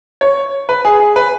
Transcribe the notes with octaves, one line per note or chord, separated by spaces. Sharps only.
C#5
B4
G#4
G#4
B4